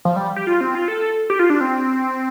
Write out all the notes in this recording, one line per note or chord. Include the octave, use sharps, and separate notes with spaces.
F3
G3
G4
F4
C4
F4
A4
G4
F4
D4
C4